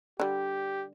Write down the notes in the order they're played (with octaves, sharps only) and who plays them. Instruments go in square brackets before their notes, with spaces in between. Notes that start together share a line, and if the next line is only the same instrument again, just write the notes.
[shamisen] D3 G3 [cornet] G4